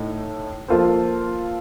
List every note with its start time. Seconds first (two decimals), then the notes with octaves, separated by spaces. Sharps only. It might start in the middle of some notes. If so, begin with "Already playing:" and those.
Already playing: A2 A3 D#4
0.68 F3 A#3 F4 A4 C5